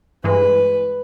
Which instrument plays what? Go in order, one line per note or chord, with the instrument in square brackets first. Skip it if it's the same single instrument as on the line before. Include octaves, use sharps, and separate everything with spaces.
[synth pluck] G2 E3 G#3 [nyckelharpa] B4